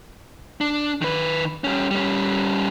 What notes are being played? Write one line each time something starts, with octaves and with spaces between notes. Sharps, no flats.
D4
D#3 B4
G3 C#4
G3 C#4